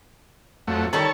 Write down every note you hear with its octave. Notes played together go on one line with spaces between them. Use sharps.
F2 F#3 A3
D#3 G3 A4 C#5 A5